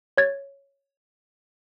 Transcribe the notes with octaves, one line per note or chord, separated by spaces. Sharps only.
C#5 G#6 A6